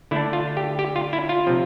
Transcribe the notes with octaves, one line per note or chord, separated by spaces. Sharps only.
D3 A3 D4 E4
F4
G4
G4
F4
E4
F4
C3 F3 C4